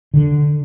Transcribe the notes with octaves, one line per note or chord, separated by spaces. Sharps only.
D3